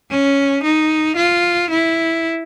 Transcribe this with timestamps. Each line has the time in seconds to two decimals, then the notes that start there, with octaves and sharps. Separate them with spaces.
0.10 C#4
0.63 D#4
1.16 F4
1.70 E4